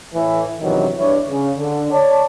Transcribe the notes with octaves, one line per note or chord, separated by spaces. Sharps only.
A2 E3
E2 G2 C3 D#3 E3 F#3
E2 G2 D4 E4 C#5
C#3
D3
C#5 D5 A5